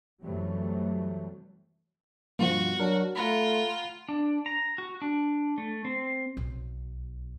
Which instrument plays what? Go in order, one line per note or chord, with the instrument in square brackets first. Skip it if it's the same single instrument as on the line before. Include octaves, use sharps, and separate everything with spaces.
[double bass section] F#2 C3 E3 F#3 G3 A3
[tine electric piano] G2 B2 F4 [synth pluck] F3 G3 A#3 [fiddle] F#4
[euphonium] F#3 [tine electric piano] D4 A#4
[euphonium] A3 [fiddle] F4 [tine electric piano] F#5 A#5 B5
[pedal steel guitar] D4
A#5
F#4
D4
A3
C4
[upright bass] B1